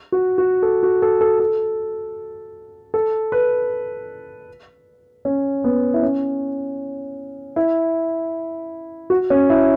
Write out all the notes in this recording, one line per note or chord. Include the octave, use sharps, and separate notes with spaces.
F#4
F#4
A4
F#4
A4
A4
A4
A4
B4
C#4
B3
E4
C#4
E4
F#4
C#4
E4